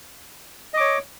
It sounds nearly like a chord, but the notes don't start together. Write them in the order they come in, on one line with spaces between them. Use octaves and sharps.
D#5 D6 C#5